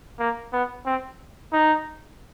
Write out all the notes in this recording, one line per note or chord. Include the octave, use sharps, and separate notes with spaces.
A#3
B3
C4
D#4